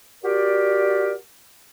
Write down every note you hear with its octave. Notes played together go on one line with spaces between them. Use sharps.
F#4 G4 A#4 D5